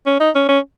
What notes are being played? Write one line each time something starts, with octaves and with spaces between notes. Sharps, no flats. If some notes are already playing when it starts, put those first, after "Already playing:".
C#4
D#4
C#4
C#4